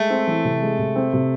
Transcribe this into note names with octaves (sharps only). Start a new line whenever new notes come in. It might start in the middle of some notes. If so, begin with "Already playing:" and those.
Already playing: G#3 A3
C4
E3
C3
G#3
C3
C4
C3